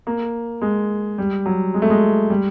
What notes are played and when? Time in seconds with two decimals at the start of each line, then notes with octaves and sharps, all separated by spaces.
0.07 A#3
0.61 G#3
1.18 G3
1.46 F#3
1.74 G#3
1.82 A3
1.90 G#3
2.30 G3